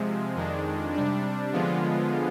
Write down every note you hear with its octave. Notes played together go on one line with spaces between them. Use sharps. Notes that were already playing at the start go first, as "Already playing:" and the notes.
Already playing: C3 F3 G#3
F2 D#3 G#3 D4
C3 G3 D4
D3 F3 G#3 B3 F4